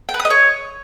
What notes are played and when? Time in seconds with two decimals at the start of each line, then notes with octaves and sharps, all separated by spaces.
0.09 G5
0.14 B4
0.20 D#6
0.25 D#5
0.30 C#5